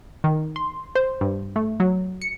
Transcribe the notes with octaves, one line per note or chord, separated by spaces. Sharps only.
D#3
C6
C5
G2
A3
F#3
C#7